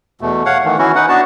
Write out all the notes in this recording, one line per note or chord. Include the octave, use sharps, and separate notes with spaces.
E2 B2 A3
C#5 F5 F#5
D#3 E3 A3
E3 C#4 E4 F#4
D#4 B4 F#5
B3 D4 F#4 A5